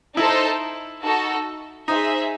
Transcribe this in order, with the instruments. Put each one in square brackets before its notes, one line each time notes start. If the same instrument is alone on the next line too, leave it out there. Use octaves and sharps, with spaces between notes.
[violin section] D#4 A4 C5 [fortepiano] E4
[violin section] D#4 F#4 A4
[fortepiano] D#4 [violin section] G#4 C5 E5